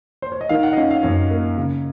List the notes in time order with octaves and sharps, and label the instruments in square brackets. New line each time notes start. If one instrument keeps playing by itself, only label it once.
[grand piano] C5
C#5
D#5
D#3 F5
F#5
D#5
C#4 F5
F5
F#2 C#5
A#3
C#3